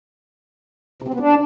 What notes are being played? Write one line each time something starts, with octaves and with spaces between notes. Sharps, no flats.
C3
C4
B3
D4